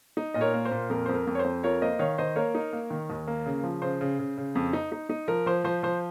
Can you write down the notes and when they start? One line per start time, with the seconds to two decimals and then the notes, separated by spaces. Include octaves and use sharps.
0.17 D#4
0.34 A#2 D#5
0.41 A#4 C#5
0.54 A#3
0.65 C5
0.71 A#2
0.90 F2 A#4
1.06 F2 C5
1.14 A#4
1.27 F2
1.35 C#5
1.39 F2 C5
1.63 F4 A#4 C#5
1.82 A#3 C5 D#5
1.99 D#3 C#5 F5
2.18 D#3 C5 D#5
2.36 A#3 A#4 C#5
2.55 D#4
2.73 A#3
2.90 D#3
3.10 D#2
3.27 A#3
3.46 C#3
3.63 F3
3.82 C#3 C5
4.01 C#3
4.19 C#3
4.38 C#3
4.55 F2
4.73 D#4
4.92 D#4
5.10 D#4
5.28 F3 A#4
5.46 F3 C5
5.64 F3 C5
5.83 F3 C5